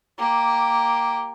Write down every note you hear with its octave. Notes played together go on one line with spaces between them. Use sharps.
A#3 G4